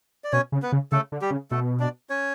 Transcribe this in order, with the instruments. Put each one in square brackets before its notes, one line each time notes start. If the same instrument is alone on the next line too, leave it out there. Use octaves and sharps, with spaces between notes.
[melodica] D5
[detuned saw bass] B2 [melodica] C#4 C#5
[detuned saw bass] C#3
[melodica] B3 B4
[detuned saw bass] C#3
[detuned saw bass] C#3 [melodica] A3 A4
[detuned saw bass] D3
[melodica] G3 G4
[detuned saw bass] C#3
[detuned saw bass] B2 [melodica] A3 A4
[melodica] D4 D5
C#4 C#5